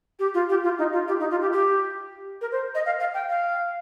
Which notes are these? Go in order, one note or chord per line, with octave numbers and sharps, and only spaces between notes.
G4
F4
G4
F4
D#4
F4
G4
D#4
F4
G4
G4
A#4
C5
D#5
F5
F5
G5
F5